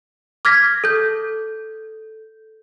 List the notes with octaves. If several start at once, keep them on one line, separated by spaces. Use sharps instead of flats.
D6 F6 G#6 A#6 B6
A4 G6